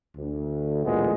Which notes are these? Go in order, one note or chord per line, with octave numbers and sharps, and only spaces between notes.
D2
A1 A#2 G#3 B3